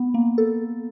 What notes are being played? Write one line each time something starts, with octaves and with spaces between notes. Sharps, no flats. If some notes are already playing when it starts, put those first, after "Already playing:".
Already playing: B3
A#3
A4